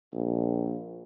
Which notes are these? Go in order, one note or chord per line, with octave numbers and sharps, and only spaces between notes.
A#1